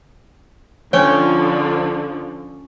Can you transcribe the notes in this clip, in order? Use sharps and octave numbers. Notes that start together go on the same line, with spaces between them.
D3 F3 C#4 C#5 G5